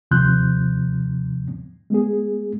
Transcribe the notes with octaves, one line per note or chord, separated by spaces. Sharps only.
D#2 C3 F3 C6 F#6 G6
G#3 B3 G#4